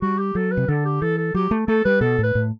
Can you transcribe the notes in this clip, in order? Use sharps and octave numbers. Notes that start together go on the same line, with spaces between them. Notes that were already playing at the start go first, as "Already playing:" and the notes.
G3 F#4
G4
F#3 A4
B4
C3
D3 A4
G4
E3 A4
A4
F#3 G4
A3
A3 A4
G3 B4
B2 A4
A2 B4
A2